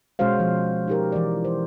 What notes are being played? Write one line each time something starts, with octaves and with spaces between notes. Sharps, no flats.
B2 G#3 C#4 F#4 C5 F5
F3
D#4 G4 A#4
E3 D5
C5